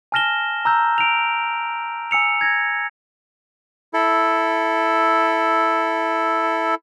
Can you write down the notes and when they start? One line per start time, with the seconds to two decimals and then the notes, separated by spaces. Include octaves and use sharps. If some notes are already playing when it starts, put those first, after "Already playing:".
0.12 G#5 A5 F6 A#6 E7 G7
0.65 A#5 E6 G6
0.98 D7 F7
2.11 G#5 E6 C#7 F7
2.41 G#6 A#6
3.94 E4 A4